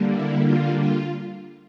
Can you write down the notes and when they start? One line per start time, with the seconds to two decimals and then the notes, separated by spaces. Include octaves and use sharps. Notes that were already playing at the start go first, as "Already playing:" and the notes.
Already playing: D3 G3 A#3
0.13 E4
0.46 F4
0.80 F4